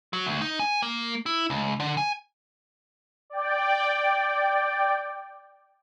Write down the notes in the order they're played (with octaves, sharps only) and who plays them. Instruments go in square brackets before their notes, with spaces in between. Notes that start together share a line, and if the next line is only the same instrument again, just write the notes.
[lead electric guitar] F#3
D2
D#4
G#5
A#3
E4
C#2
D3
G#5
[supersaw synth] D5 G5